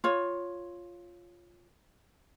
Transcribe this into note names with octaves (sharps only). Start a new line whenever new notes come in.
F4 C#5